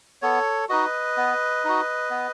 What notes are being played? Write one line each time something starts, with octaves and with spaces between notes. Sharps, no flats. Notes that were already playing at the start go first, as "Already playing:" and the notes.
B3 A4 C#5
D#4 F#4 B4 D#5
B3
D#4 F#4
B3